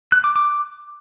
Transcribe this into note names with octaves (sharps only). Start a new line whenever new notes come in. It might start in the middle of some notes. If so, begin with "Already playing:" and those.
F#6
D6
D6